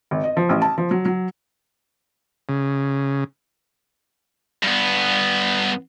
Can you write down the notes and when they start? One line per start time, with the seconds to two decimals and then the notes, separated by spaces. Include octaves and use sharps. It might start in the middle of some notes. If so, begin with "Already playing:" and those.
0.11 G#1
0.24 D#5
0.37 F3
0.49 A1
0.62 A5
0.78 F3
0.91 F#3
1.05 F#3
2.49 C#3
4.63 G2 B3